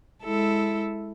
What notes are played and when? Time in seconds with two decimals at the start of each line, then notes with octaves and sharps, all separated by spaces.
0.24 G#3 E4 A4